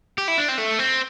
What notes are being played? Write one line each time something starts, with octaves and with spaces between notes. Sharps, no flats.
G4
E4
D4
C4
A3
C4